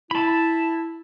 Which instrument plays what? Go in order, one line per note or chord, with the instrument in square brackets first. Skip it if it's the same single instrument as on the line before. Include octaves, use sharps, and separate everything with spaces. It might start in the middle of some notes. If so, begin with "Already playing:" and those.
[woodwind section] E4 [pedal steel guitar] A5 B5